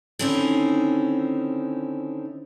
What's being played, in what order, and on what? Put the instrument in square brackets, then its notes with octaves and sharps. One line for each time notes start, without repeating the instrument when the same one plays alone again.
[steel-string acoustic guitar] D3 D#3 C4 C#4 D#4 E4